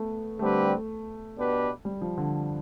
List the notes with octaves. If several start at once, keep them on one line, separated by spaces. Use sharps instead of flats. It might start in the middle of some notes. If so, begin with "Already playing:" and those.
Already playing: A3 B3
D3 G3 A3 C4 G4 B4
B2 B3 D4 G4 B4
G3
F3
D3